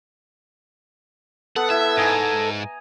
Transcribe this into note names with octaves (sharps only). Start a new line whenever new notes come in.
B3 A4 F#5
E4 E5
G#2 D#5 G#5 A#5